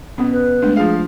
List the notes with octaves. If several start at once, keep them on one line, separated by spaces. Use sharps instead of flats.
B2 B3 C#4
B4
G#3 A3 D4
F3 G#4 F5